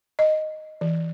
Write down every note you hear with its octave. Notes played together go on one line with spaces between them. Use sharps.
D#5
E3